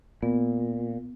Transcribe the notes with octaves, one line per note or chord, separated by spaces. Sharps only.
A#2 B3